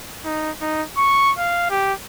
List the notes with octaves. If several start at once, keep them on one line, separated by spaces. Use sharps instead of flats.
D#4
D#4
C#6
F5
G4